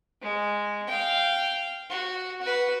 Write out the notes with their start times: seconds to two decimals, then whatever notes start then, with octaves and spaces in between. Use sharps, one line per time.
0.22 G#3
0.87 F5 G5
1.90 F#4
2.42 F#4 B4